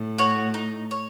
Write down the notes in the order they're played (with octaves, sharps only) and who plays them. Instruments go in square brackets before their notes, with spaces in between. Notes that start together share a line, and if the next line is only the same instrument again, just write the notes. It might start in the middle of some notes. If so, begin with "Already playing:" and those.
Already playing: [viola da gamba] A2
[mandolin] F#4 C#5
D#4
C#5